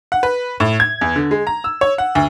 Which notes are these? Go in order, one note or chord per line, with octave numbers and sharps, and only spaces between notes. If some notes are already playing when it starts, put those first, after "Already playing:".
F#5
B4
A2
G#6
E2
D3
G#3
A#5
E6
C#5
F#5
D2